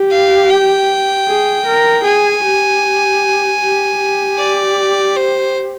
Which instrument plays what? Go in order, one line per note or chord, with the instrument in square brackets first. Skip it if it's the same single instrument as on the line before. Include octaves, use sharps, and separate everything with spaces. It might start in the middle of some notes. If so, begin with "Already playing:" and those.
Already playing: [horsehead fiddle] G4
[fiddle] F5
G5
[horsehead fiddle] G#4
A#4
[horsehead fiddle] G#4 [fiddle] G#5
[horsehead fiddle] G4
G4
G4
[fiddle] D5
C5